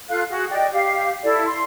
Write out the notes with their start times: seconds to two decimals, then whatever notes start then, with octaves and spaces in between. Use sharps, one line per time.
0.10 F4 A4 F5 F#6
0.29 F#4 G#4
0.50 D5 D#5 G5
0.73 G4 F5
1.23 E4 A4 D5
1.45 C6